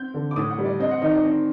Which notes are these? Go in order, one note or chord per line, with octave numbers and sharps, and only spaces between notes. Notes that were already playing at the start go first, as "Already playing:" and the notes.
Already playing: C4 G6
D3
D6
A2 D#6
F#5
G3
D5
C4 D#5
F#5
D#3 D#5
D5
C4